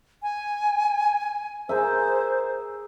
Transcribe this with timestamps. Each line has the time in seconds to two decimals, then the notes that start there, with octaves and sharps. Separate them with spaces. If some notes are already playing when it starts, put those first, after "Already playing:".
0.23 G#5
1.69 G#4 A#4 C5 E5